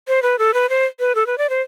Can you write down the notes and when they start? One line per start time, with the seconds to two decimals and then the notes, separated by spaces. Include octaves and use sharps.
0.08 C5
0.22 B4
0.39 A4
0.54 B4
0.69 C5
1.00 B4
1.15 A4
1.27 B4
1.38 D5
1.50 C5